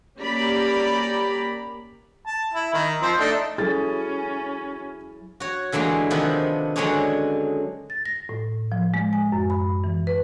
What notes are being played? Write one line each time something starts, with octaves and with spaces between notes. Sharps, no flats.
A#3 C#4 G4 D5 A#5 B5
A5
E4
D#3
F3 C4 C5
A3 D4 D#4
F#3 C#4 E4 G#4 A4 A6
F#4 C#5
D3 E3 F#3 G#3 A#3
C3 D#3 F3 B3 D4
D3 F#3 G#3 C#4 D4 C#5
A6
A#6
A2
F3
G#3
G#5
F#2
B5
E3
B4